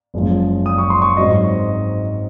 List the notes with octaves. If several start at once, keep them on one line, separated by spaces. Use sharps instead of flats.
F#1 F#2 F3 G#3
D#6
C#6
C6
C#6
G#2 F#3 C4 D#5